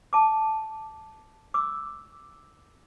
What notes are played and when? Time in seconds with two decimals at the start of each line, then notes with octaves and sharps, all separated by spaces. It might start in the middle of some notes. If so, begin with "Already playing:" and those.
0.13 A5 D6
1.54 D6 E6